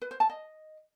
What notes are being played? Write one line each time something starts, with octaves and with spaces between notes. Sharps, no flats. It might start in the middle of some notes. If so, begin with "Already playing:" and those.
B4
C5
A5
D#5